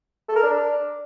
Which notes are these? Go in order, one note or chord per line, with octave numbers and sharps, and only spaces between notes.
A4
A#4
D4